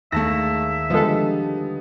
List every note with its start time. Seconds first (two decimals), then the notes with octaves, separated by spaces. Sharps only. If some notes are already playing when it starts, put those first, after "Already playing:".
0.12 D#2 G#3 A3 E5 A5 A#6
0.90 D3 F3 G3 G#3 B3 D#4 A4